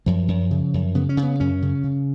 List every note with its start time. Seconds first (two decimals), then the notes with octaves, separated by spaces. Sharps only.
0.06 F#2 F3
0.28 F#2
0.51 C#3
0.74 F#2
0.95 C#3 B3
1.09 C#4
1.17 C#3
1.23 B3
1.40 F#2 C#4
1.62 C#3
1.83 C#3